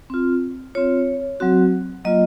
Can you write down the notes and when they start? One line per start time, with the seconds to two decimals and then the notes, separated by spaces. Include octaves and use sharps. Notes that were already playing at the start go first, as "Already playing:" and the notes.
0.10 C4 F4
0.75 C4 F4 C#5
1.40 F#3 C4 F#4
2.04 F#3 A#3 F4 D#5